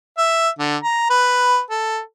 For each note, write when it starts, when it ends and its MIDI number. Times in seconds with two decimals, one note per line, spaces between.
0.18 0.49 76
0.59 0.77 50
0.84 1.07 82
1.10 1.61 71
1.70 1.99 69